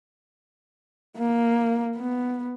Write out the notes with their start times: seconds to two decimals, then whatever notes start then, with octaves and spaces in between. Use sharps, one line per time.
1.17 A#3
1.96 B3